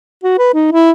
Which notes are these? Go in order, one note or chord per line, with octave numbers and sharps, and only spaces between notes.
F#4
B4
D#4
E4